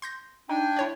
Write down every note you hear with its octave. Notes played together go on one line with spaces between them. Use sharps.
C6 G6 A#6
D4 D#4 G5 G#5
E4 C#5 D5